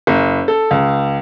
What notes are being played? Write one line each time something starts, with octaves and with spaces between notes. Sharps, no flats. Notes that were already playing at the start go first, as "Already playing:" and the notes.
F#1
A4
C#2